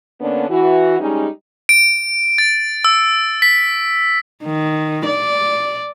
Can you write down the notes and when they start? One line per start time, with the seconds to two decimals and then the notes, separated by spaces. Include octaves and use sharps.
0.20 D3 A#3 B3 C#4 D4
0.50 E3 F#4
1.00 G3 G#3 C#4 D#4
1.69 D7
2.38 A6
2.85 E6
3.42 B6
4.44 D#3
5.06 D5